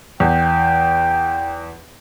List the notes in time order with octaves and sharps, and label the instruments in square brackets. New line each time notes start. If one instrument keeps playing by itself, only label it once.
[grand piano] E2 [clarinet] G5